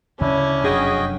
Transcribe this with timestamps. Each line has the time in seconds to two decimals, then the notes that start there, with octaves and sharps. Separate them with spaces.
0.21 D2 C#3 C#4 D4 E4
0.64 F1 F#2 D4 F#4 G#4 D#5 G5